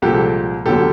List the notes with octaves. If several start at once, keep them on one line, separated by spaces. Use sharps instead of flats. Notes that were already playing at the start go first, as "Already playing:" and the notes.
C2 A#2 F3 G#3 G4 A4
E1 D2 D3 F#3 G4 A4